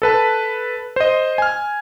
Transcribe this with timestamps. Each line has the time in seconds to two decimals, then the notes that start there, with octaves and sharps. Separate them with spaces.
0.02 A4 B4 A5
0.96 C5 D#5
1.38 G#5 F6